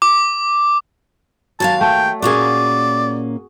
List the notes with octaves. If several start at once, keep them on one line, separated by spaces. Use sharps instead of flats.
D6
D#2 F#3 G#3 F5 A5
A3 G5
A#2 A#3 C#4 F#4 G#4 D5